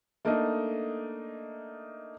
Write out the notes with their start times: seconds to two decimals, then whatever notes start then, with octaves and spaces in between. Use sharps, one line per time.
0.25 A3 A#3 D4 D#4 A4 D#5